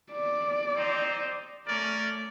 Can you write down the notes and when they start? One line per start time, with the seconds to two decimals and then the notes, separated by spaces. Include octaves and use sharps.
0.11 D5
0.76 C4 D#4 C5
1.68 A3 C#4 A#4 D5